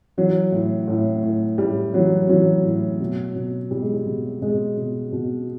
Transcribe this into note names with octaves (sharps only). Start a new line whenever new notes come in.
E3 F#3
A2
A2
A2
A2 G3
E3 F#3
E3 F#3
A2
B2
B2
B2 G3
G#3
G3
B2
B2 G#3
B2
B2